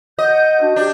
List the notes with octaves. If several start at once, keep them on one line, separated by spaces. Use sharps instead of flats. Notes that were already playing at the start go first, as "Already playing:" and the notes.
D#5 F#5 G6
D4 F#4
D4 G4 G6